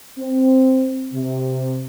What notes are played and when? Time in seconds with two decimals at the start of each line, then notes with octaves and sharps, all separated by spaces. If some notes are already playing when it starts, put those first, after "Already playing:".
0.19 C4
1.14 C3